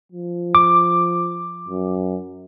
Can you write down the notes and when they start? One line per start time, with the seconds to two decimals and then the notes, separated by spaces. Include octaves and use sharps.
0.12 F3
0.55 D6
1.68 F#2